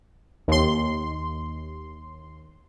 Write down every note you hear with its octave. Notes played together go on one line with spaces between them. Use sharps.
D#2 C6